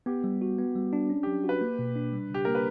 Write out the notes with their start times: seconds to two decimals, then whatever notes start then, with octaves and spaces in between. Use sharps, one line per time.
0.06 B3 G4
0.24 G3
0.42 F#4
0.58 B3
0.75 G3
0.93 D4
1.10 C#4
1.23 F#3 G4
1.44 F#4
1.49 B4
1.61 A#3
1.79 B2
1.96 D4
2.13 G3
2.30 C#3 G4
2.45 A#3 A#4
2.55 B4